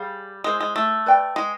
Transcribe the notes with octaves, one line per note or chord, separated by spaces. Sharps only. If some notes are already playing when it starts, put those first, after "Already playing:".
Already playing: G3 G#4 C#5 F5
G#3 E4 G#4 C5
G#3
A3
B4 D5 G5
G#3